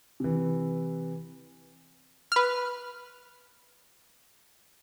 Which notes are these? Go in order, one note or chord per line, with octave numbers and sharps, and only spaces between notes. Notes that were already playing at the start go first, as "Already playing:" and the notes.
C3 E3
B4 F6